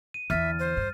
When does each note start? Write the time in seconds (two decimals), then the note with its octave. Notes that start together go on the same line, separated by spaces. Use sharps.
0.14 D#7
0.30 E2 D3 E5 F6 A6
0.59 C5
0.77 G2